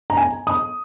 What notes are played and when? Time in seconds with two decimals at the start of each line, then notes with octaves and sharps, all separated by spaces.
0.10 A#5
0.17 G#5
0.47 D#6